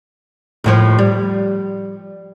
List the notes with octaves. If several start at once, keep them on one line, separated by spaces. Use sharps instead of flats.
D#2 A2 F3
G3